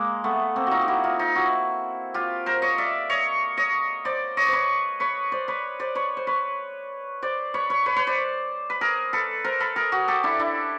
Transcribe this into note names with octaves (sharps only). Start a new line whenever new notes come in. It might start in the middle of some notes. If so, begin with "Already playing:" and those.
Already playing: G#3 A#3
A3 B3
A#3 C4
D#4 F4 F#4
G4
E4 F#4
D#4 F4
D#4 F4
E4 F#4
F4 G4
A#4 C5
C#5 D#5
D5 E5
C#5 D#5
C#5 D#5
C5 D5
C#5 D#5
C5
B4 C#5
B4 C#5
C5 D5
B4 C#5
C5 D5
B4 C#5
C5
B4 C#5
C5 D5
B4 C#5
B4 C#5
B4 C#5
B4 C#5
C5 D5
B4
G#4 A#4
A4 B4
A#4 C5
A4 B4
G#4 A#4
F#4 G#4
G4 A4
D4 E4
D4 E4